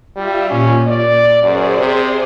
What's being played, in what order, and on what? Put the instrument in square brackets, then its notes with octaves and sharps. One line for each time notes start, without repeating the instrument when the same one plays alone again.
[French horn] G3 [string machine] F4 G4 E5
[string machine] A#2 [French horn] C#4
[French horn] D5
[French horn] F#2 [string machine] G#4 C5 D5
[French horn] C3